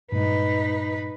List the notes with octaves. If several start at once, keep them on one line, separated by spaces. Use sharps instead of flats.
G2 A#2 G#3 D#4 B4